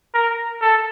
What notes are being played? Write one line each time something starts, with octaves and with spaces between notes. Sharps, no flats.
A#4
A4